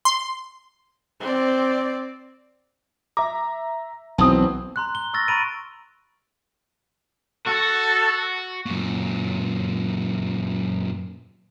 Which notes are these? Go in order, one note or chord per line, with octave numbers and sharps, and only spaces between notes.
C6
C4 D5
E5 A#5 D6
B1 E3 C4 A5 B5 D#6
A#5 C6 F#6
G7
C#6 E6 F6 A6 A#6
A#5 B5 C#6 A6 D7 D#7
F#4 A4
F#2 A#2